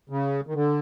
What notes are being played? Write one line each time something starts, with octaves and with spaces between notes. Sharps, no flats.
C#3
D#3
D3